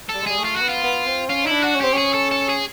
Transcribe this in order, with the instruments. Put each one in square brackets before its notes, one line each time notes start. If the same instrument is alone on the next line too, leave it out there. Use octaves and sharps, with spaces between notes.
[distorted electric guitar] A4
[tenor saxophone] G3
G#3
[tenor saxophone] G3 [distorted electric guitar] G#4
[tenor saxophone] A3
[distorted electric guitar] F4
[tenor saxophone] B3 [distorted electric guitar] F#4
[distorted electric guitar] F4
[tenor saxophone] B3
C4
[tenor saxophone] C#4 [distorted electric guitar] F4
[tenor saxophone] D#4 [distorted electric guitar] E4
[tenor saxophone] D4
[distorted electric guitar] F#4
[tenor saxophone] C#4
[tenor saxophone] C4 [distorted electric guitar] G4
[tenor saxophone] C#4 [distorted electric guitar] G#4
[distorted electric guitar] A4
A4
G#4